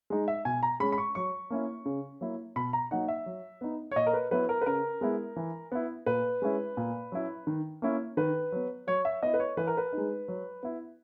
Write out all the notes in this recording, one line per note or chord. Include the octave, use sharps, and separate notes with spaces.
G#3 D#4
E5
B2 G#5
A#5
G#3 C#4 B5
B5
C#6
F#3 C#6
A#3 C#4 E4
C#3
F#3 A#3 E4
B2 B5
A#5
F#3 A#3 D#4 F#5
E5
F#3
B3 D#4
C#5
A#2 D#5
A#4
B4
F#3 B3 E4 B4
A#4
B4
C#3 A#4
G#3 B3 E4
E3
B3 E4
A#2 B4
G#3 C#4 E4
A#2
F#3 C#4 E4
D#3
A#3 C#4 E4
D#3 B4
F#3 B3
F#3 C#5
E5
B3 E4 D#5
B4
C#5
E3 B4
A#4
B4
G#3 D#4
F#3
B3 E4